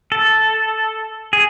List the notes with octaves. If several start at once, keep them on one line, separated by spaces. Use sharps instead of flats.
A4
G#4